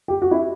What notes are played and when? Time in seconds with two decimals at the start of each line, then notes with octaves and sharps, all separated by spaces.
0.08 G4
0.22 F#4
0.31 E4